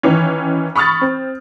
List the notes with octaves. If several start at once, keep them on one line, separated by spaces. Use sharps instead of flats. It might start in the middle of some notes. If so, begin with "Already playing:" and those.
D#3 E3 C#4
B5 C#6 D#6 F6 A6
C4